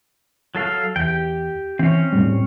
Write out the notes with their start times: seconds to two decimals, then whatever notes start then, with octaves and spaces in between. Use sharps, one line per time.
0.55 F#3 A4 F5
0.96 E2 G4 G5
1.79 E3 C4 C#4
2.12 E2 A2 G3